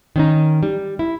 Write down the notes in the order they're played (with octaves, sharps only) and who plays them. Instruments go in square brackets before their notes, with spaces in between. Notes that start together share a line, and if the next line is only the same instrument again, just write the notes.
[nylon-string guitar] D#3 C#4 D#4
G3
E4